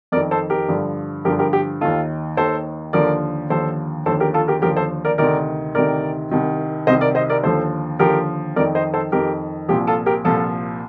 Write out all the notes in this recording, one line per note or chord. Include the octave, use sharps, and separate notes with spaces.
F2 D#3 A#4 D5
A4 C5
G4 A#4
G2 D3 F3
G2 D3 F3 G4 A#4
G4 A#4
G4
D#2 D#3 F4 A4
D#2 D#3 A4 C5
D#2 D3 F3 A#4 D5
D#2 D3 F3 A4 C5
D#2 D3 F3 A4 C5
G4 A#4
F4 A4
G4 A#4
D#2 D3 F3 G4 A#4
A4 C5
A#4 D5
D2 C3 D#3 A#4 D5
D2 C3 D#3 A#4 D5
C2 C3 D#3
C2 C3 D#3 C5 D#5
A#4 D5
C5 D#5
A#4 D5
D#2 D3 F3 A4 C5
D#2 D3 F3 G4 A#4
F2 D#3 A#4 D5
C5 D#5
A4 C5
F2 D#3 G4 A#4
C2 A#2 F3 G4
F4 A4
G4 A#4
C2 A#2 F3 F4 A4